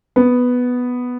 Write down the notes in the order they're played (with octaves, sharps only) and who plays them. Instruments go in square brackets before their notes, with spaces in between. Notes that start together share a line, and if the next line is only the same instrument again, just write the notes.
[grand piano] B3